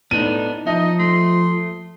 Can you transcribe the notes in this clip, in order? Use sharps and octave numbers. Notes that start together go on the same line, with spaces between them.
A2 B3 D4 D#4 D#7
F3 D#4 D#5 E5 A5 D#6
A3 C6